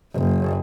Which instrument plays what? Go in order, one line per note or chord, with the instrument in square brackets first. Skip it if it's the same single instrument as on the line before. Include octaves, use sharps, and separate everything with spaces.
[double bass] F#1